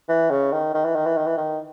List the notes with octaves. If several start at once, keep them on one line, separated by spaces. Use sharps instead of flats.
E3
C#3
D#3
D#3
E3
D#3
E3
D#3
E3
D#3